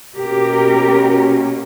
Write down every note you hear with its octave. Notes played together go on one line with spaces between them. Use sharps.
B2 A#3 C#4 G4 A#4